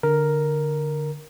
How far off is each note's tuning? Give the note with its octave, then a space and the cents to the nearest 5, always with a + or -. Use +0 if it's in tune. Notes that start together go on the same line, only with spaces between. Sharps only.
D3 +0 A#4 +0